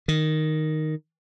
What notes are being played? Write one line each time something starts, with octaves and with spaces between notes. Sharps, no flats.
D#3